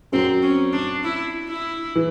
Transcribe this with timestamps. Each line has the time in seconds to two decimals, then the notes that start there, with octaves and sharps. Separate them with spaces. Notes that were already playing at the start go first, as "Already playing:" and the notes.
0.12 F#2 F#3 C4
0.42 C#4
0.73 D4
1.04 E4
1.49 E4
1.95 E3